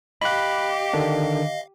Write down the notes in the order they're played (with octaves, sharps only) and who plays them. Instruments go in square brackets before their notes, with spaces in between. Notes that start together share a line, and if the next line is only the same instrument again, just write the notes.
[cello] G4 [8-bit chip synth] D#5 F5 [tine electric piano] B5 F#6
[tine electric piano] D3 D#3 D4